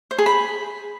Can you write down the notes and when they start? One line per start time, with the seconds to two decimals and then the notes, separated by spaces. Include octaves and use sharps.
0.11 C5
0.18 G#4
0.26 B5